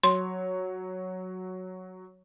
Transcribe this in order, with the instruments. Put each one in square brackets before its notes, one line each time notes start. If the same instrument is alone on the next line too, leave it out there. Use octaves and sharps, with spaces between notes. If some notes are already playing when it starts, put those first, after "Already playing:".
[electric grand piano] F#3 C#5 [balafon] C6